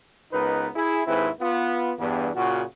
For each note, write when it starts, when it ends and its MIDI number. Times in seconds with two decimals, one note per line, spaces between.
0.32 0.69 37
0.32 0.69 59
0.32 0.69 63
0.32 0.69 70
0.32 0.69 71
0.76 1.01 64
0.76 1.01 68
1.07 1.29 39
1.07 1.29 44
1.07 1.29 60
1.07 1.29 64
1.07 1.29 68
1.07 1.29 71
1.40 1.91 59
1.40 1.91 65
1.99 2.30 40
1.99 2.30 43
1.99 2.30 59
2.36 2.63 46
2.36 2.63 49
2.36 2.63 65
2.36 2.63 66